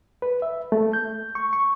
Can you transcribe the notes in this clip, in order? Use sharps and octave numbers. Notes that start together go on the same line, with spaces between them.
B4
E5
A3
G6
C#6
C#6